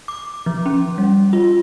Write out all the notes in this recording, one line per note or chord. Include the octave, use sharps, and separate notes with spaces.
D6
F3
C#4
G3
F4